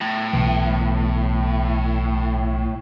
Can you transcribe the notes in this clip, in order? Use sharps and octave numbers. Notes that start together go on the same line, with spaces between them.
A2
B1 E3